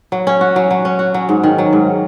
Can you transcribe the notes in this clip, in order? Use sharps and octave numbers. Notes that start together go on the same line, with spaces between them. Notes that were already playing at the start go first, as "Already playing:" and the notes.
F#3
C#4
F#4
F#3
F#3
C#4
F#4
F#3
G#2
D#3
F#3
G#2